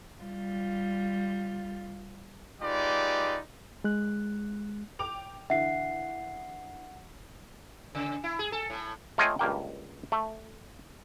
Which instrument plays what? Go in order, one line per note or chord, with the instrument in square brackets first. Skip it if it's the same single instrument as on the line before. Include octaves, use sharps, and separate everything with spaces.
[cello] G3 F4
[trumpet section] G#3 D#4 F4 G4 B4 D5
[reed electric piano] G#3 F#6
[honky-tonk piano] G5 D6 F7
[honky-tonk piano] D3 E3 [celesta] E5 [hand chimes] F#5 C7
[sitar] C#3
E4
G#4
A4
A2
[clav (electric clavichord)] A3 F4 C#5 D#5 G5 G#5
C#2 G2 A#3 G5
A3